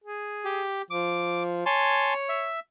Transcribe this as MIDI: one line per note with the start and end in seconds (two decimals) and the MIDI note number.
0.04 0.62 68
0.45 0.82 67
0.91 1.64 53
0.91 1.43 86
1.66 2.50 73
1.66 2.13 80
1.66 2.13 81
1.66 2.13 84
2.29 2.60 76